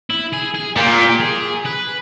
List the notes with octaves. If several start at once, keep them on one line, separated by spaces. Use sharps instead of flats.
E4
G#4
G#4
A#2 G4
G#4
G4
G#4
B4